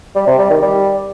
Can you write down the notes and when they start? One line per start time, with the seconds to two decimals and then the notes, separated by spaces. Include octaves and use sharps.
0.15 G3
0.27 C3
0.39 G3
0.50 D#3
0.62 G3